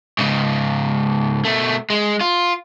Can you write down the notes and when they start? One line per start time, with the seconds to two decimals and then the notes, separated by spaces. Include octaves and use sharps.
0.19 G#2 C#3
1.45 B2 A3
1.90 G#3
2.21 F4